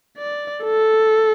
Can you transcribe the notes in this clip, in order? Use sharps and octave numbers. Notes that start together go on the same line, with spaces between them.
D5
A4